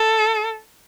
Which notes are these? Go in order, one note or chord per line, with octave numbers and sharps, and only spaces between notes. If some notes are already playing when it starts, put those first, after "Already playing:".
Already playing: A4